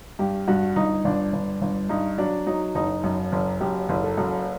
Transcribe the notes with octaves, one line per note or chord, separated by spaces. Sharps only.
G2 G4
G2 F#4
G1 D#4
G1 D4
G1
G1
G2 D#4
F#3 D4
F#3 D#4
F#1 D#4
F#2
F#1
F#2 G4
F#1
A4
F#2